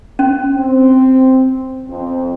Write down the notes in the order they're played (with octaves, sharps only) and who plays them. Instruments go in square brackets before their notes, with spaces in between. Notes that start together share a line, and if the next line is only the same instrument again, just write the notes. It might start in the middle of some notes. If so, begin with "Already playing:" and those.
[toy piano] C#4
[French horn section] C4
F2 C4